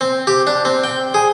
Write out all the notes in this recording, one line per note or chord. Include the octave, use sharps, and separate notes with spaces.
C4
G4
D4
C4
G5
G#4